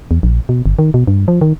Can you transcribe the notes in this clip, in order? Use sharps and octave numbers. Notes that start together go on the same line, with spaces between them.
E2
A#1
B2
G1
D#3
B2
G2
F3
D#3